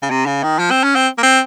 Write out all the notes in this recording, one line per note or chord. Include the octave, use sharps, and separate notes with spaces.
C#3
C3
C#3
D#3
F3
C4
C#4
C4
A#3
C4